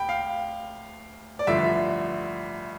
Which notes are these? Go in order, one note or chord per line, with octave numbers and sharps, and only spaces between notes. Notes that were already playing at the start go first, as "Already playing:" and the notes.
Already playing: D2 G5 B5
F5
D5
A1 G2 D3 F3 E5